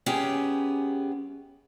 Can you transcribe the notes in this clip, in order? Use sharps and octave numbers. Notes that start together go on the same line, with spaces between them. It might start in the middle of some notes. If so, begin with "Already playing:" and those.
F#2 B3 C#4 G4 G#4 G5